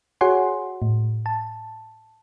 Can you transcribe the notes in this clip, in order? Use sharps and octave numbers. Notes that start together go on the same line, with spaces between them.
F#4 G#4 C#5 F#5 G#5 C6
A2
A5